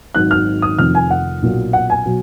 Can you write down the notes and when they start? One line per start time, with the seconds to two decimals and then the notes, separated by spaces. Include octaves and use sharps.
0.15 G#1 G#2 D#3 F#3 F#6
0.31 F6
0.62 D#6
0.78 F1 F2 D#3 F6
0.95 G#5
1.10 F#5
1.42 B1 A#2 F#3
1.73 F#5
1.90 G#5
2.06 B2 F#3